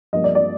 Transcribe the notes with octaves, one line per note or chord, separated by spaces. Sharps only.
G2 F3 A#3 D#5
D5
D5